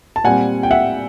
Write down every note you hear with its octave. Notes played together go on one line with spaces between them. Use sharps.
A5
A#2 G3 C4 F#5 G#5
G5
E5 F#5